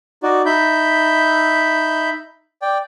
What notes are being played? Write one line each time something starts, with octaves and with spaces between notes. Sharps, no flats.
D#4 F#4 D5
D#4 E5 B5 G6
D5 G5